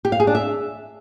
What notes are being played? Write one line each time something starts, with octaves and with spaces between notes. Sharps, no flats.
G4
F5
G#4
D4
E5